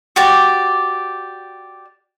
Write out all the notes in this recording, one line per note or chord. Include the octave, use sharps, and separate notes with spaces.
F#4 G4 D5